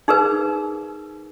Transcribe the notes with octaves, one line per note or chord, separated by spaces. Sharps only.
D#4 G#4 A#4 B4